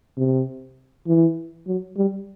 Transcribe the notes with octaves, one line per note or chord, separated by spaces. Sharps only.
C3
E3
F#3
G3